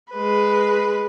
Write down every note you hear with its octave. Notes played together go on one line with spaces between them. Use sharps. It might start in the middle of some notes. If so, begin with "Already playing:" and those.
G#3 B4